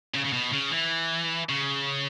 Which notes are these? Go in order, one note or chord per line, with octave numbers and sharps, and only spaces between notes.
C#3
C#3
B2
C#3
E3
C#3